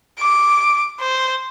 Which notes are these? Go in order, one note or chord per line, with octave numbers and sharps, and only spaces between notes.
D6
C5